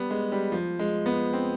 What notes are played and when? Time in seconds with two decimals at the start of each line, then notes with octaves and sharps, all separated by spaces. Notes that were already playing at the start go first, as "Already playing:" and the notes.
Already playing: G3 B3
0.10 G#3
0.32 G3
0.52 F3
0.79 G#3
1.06 B3
1.33 C4